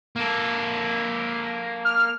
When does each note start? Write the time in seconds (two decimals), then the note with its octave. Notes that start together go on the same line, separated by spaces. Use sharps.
0.16 A#3 A4
1.85 F6